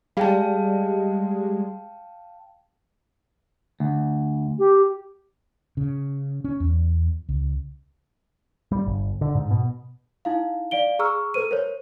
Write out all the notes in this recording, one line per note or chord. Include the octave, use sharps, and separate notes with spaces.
G3 G#3 F5 G5 A5
D2
G4
C#3
C#4
E2
C#2
G3
G1
D3
G#2
B2
D#4 E4 F5
D5 F5 D7 G7
G#4 A#5 C#6 E6 F6
A4 B4 C5 D#7
A#4 C5 C#5